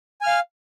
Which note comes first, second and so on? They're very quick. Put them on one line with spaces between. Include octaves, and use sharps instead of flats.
G#5 F6 F5